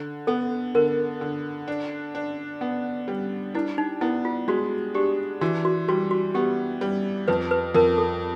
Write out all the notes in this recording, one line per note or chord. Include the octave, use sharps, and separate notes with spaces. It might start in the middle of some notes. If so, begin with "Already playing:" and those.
Already playing: D3
B3 A4
D3 A#4
D3
D4
D4
B3
G3
D4 E4
D#4
B3 E4
F4
G#3 F#4
D4 G4
E3 F#4
F#4
G3 F#4
F#4
B3 G4
G3
F2 B4
B4
F2 A#4
A4